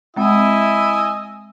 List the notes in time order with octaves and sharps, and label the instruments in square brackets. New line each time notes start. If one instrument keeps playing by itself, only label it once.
[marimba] G#3 C4 [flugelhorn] E4 [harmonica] D#5 G#5 E6